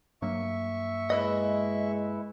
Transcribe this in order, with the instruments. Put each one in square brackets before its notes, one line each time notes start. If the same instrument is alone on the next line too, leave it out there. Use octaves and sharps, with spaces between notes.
[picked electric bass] G2 F#3 A#3 [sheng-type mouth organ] E5 C#6
[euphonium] G#3 [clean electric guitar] E4 B4 D#5